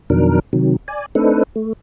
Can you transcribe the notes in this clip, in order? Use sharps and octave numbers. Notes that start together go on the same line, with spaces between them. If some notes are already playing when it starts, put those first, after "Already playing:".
F2 B2 D#3 F#3 D4 A#4
C3 D#3 F#3
D5 G#5
A3 C4 D4 D#4 A4 B4
A3